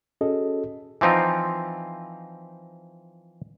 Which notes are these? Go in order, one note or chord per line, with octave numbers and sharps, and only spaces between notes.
C#4 F#4 G#4 A4 D#5
E3 F3 C4 D#4 F4